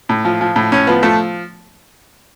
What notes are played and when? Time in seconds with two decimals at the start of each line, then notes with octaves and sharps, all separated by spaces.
0.09 A2
0.25 F3
0.41 F3
0.56 A2
0.72 A2 C#4
0.87 F3 B3
1.03 F3 A3